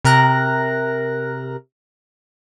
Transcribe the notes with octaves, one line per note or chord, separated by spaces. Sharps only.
C3 A#4 A#5 F#6 A#6